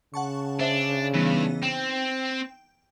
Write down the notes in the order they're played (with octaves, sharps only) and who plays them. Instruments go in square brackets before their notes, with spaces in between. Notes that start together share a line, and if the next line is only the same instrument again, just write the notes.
[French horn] C#3 [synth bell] F#5 A5 C#6
[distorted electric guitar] D4 [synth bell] C5 E5
[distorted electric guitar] G2 [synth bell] E3 B3 D#4
[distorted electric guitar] C4 [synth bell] G5